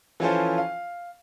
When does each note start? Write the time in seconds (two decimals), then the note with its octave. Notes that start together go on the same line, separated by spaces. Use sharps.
0.20 E3 F3 C#4 F4 A4 C5
0.58 F5